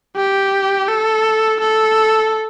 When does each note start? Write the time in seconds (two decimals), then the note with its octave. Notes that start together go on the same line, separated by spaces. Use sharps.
0.16 G4
0.88 A4
1.61 A4